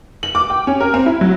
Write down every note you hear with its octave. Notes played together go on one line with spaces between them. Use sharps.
F#7
D6
G5
C#4
A#4
C4
E4
F#3